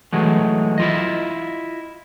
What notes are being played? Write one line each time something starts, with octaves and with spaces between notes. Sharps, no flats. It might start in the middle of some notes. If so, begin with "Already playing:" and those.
E3 F#3 G#3 A3
E4 F4 D#5